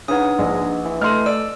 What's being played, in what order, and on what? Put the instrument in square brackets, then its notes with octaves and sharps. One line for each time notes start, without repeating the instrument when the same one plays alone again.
[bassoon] C#3 [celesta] D4 B4 F#5 [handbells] D#4 D#6
[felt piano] A#1 [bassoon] G#3
[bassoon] E3
[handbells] A3 A4 [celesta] D#5 [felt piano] C6 F6
[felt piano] D5 [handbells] E6